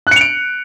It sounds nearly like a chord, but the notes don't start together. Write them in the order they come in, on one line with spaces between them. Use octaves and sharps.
F#6 C#7 F7 D7